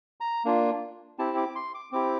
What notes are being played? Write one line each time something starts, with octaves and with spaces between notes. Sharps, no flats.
A#5
A#3 D4 F4
C4 E4 G4 A5
D6
C6
D6
C4 E4 G4 D6